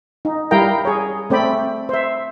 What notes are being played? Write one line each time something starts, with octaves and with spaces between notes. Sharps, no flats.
D#4
G3 E4 A#4 F5 G5 A#5
G#4 C#5
A3 C4 D5 G5 B5
C5 E5